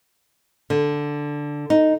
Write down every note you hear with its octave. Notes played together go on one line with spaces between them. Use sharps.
D3
D#4